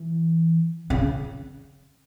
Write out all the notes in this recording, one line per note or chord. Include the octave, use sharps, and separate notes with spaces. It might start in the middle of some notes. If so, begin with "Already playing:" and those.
Already playing: E3
C#3